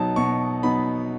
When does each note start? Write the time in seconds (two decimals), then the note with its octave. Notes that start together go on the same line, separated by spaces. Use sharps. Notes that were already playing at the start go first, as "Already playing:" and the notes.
Already playing: B2 F#3 B3 D#4 A5
0.16 B2 C#6
0.63 F#3 B3 D#4 B5